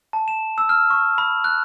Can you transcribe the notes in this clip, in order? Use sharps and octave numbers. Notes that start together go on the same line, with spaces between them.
A5
E7
E6
F6
C#6
B5
F#6